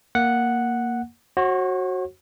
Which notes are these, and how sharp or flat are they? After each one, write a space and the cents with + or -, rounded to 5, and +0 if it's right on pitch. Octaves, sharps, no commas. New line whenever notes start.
A#3 +0 F#5 +0
F#4 +0 C#5 -45